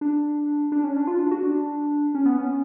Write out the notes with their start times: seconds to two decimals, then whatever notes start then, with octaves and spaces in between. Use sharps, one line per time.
0.01 D4
0.72 D4
0.84 C#4
0.96 D4
1.07 F4
1.19 D4
1.31 F#4
1.43 D4
2.15 C#4
2.26 B3
2.38 C#4